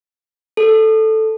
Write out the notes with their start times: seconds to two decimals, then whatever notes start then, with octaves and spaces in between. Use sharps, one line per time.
0.57 A4